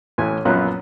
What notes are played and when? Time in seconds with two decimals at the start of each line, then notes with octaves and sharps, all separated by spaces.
0.18 A1 E3 G#5
0.45 A#1 F#2 B3 C#4 F4 F#6